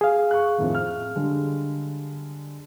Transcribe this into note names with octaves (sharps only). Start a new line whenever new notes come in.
G#4 F5
C#6 F#6
F2 A2 D#3
F6
D3 G3 G#3